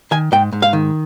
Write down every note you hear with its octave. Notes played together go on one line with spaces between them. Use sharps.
D#3 G#5
G#2 G5
G#2
F5
D#3